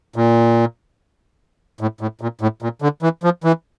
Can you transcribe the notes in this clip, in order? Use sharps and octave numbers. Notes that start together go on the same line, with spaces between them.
A#2
A2
A2
A#2
A2
A#2
D3
E3
F3
E3